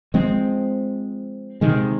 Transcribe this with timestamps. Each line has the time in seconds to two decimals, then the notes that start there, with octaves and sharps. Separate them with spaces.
0.14 F3 G#3 C4
1.61 C3 D#3 G#3